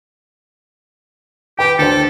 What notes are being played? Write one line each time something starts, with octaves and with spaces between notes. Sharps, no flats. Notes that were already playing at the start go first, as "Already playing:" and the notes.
G4 B4 G5
D2 A4 C5